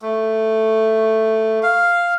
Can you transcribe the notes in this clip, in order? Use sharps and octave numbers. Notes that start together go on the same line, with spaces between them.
A3
F5